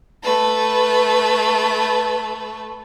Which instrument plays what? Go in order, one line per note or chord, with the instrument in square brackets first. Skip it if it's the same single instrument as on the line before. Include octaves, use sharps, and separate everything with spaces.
[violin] A3 B4